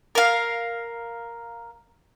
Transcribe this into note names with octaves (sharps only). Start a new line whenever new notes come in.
A#4 F5